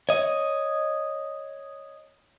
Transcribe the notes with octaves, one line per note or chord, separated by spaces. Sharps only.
C#5 D#5